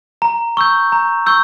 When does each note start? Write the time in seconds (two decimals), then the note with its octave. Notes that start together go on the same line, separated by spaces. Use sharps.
0.22 A#5
0.57 C#6 E6 G6
0.92 A#5
1.26 C#6 E6 G6